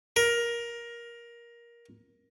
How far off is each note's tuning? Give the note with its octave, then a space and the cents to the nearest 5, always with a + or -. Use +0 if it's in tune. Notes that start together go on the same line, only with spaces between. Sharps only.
A#4 +15